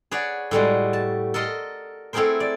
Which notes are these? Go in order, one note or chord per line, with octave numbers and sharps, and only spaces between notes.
G#4 B4 C#5 D5 F#5
A2 G3 G#3 F#4
A5
A4 A#4 D#5 C6
A3 C4 E4 G#4 A#4 C5
D5